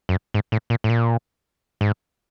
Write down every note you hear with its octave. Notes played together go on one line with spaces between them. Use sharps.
F#2
G#2
A2
A#2
A2
A#2
G#2